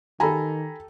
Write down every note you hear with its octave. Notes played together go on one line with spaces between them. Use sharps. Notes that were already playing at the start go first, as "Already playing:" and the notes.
D#3 G4 A4 G#5 A#5 B5